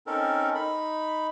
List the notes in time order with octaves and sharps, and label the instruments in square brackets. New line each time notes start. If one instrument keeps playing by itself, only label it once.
[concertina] C4 C#4 D#4 A4 A#4
D#4 B5